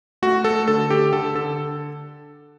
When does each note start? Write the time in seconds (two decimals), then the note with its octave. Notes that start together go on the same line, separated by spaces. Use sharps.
0.22 A3 F#4
0.44 A3 A4
0.68 D3 A4
0.90 D3 G4
1.13 D3 A4
1.35 D3 A4